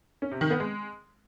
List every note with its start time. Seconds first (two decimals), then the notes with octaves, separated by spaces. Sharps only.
0.22 C#4
0.31 C3
0.41 D#3
0.50 B3
0.60 G#3